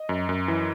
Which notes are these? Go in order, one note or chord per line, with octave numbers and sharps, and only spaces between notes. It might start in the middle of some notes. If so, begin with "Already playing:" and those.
Already playing: D#5
F#2
F#2
E3